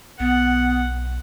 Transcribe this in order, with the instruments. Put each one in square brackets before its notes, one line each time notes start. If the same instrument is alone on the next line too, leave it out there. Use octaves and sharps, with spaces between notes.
[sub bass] B1 [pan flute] B3 [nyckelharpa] F#5